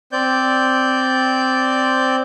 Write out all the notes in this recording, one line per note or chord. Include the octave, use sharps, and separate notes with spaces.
C4 D5 G6